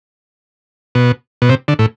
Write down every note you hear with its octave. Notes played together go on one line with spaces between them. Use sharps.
B2
B2
C3
D3
A2